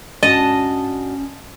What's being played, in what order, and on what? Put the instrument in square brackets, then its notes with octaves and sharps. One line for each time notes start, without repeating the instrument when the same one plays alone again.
[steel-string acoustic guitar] G#2 D4 F#4 [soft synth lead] C#4 [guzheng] D#5 [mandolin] A5